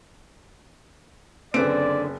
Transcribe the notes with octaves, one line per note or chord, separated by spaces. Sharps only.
F#1 D3 C4 B4 D5 D7